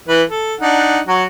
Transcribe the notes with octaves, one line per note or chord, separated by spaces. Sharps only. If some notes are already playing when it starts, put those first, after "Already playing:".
E3 B4
A4
D4 D#4 F#5
F#3 F#4